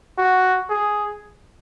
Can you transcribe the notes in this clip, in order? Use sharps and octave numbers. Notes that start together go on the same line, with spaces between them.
F#4
G#4